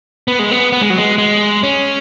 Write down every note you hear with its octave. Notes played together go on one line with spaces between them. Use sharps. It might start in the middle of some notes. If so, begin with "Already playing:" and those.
B3
G#3
B3
B3
G#3
F#3
G#3
G#3
C#4